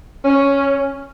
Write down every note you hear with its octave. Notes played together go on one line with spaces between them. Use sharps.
C#4